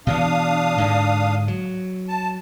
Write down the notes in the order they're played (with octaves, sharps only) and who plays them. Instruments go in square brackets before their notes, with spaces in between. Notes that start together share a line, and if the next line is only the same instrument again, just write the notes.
[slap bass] B2 E3 B3 [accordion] D4 F5 D#6
[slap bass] G#2 D3
F#3
[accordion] A5